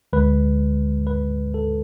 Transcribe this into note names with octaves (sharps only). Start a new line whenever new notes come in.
D2 D3 G#3 B4
B4
A4